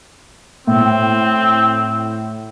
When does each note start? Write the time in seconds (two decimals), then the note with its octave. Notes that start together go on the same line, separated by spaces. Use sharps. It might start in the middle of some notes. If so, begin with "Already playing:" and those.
0.67 A2 C4